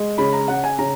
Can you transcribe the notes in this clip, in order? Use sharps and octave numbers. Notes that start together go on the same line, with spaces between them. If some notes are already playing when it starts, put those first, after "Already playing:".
Already playing: G#3
C#3 B5
A#5
C#3 F#5
G#5
C#3 A#5